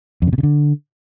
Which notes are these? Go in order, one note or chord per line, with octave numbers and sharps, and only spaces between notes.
F2
C#3
B2
C#3
D3